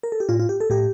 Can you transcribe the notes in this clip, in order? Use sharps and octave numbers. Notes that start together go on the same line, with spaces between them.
A#4
A4
G4
A2 F4
F4
G4
A4
A2 G4